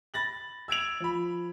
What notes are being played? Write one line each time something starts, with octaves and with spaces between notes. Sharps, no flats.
B5 A6 A#6 F#7
E6 G#6 D7 F7
F3 B5